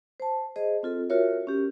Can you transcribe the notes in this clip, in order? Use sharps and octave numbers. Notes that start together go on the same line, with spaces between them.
C5 A5
G#4 C5 D#5
C4 F4 A4
F4 F#4 A#4 C#5 E5
C#4 G4